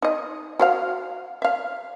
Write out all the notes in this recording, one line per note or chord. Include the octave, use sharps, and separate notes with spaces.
D#4 D#5
F#4 C5 F5
E5 F5